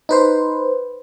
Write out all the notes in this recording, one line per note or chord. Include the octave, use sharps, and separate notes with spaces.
D#4 B4 C5